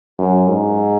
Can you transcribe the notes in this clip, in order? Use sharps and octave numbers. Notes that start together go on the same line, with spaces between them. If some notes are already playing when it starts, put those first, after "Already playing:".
F#2
G#2